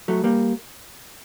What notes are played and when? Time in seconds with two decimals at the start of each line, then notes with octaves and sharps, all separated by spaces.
0.08 F#3 A3
0.24 G3 A#3